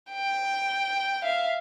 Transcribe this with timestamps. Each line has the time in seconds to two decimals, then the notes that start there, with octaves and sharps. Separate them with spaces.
0.12 G5
1.23 E5 F5